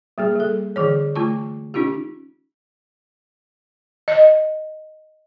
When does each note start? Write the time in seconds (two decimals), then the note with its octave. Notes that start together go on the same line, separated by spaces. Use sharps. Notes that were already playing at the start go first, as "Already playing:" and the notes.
0.18 G3 A#3 G#4
0.36 G3 A4
0.76 D3 E3 G#4 C#5
1.15 A3 F4 A5 C#6
1.74 C#4 D#4 F4 G4
4.08 D#5